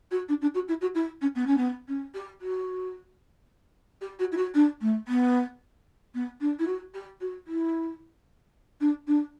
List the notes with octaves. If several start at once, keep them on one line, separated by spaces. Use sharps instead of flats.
F#4
D4
D4
F#4
E4
F#4
E4
C#4
B3
C#4
B3
C#4
G4
F#4
G4
F#4
E4
F#4
D4
A3
B3
B3
D4
E4
F#4
G4
F#4
E4
D4
D4